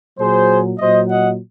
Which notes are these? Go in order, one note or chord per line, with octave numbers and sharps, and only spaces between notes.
A#2 F#3 G#4 C5
A#2 F#3 C5 D#5
D#5 F#5